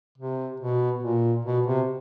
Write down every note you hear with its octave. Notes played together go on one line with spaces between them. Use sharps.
C3
B2
A#2
B2
C3